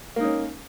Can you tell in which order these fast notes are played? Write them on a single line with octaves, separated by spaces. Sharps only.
A#3 D#4 C#4